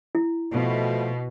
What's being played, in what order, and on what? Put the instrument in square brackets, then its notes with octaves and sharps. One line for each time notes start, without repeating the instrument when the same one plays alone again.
[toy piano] E4
[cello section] B2 [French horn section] F3 A3